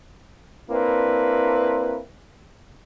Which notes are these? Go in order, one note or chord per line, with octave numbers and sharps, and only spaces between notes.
A#3 C4 D4 E4 B4